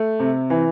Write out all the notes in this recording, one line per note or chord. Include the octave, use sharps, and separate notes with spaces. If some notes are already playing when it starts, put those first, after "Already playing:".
Already playing: A3
C3
E3